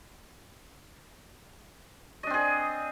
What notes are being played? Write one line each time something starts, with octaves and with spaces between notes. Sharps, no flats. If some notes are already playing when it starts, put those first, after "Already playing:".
C4 D4 G#4 D#5